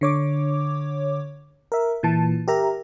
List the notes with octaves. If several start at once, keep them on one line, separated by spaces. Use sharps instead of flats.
D3 C#5 D6
A#4 E5
A#2 E3 A5
G4 A#4 E5 A#5